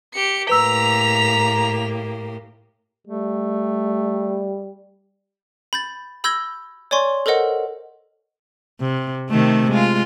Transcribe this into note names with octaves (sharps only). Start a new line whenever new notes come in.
G4 C#7
A2 A#3 G4 B4 A#5 E6 B6 F7
G3 A3
B5 G6 A6
B5 E6 G6 G#6 A#6 G7
C#5 D5 G#5 C6 C#6
A4 A#4 C5 D#5 F#5
C3
C3 D#3 A3
G#3 F4